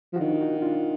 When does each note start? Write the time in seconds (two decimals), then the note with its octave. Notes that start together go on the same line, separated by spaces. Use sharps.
0.13 F3
0.16 F#4
0.19 D#3 D4 F4
0.41 D#4 F#4
0.62 D4 F4